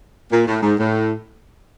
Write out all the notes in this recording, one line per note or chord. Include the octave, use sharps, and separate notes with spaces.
A#2
A2
G#2
A2